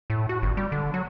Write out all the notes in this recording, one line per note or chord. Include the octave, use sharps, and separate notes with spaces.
A2
F#4
G1
G3
D3
F#3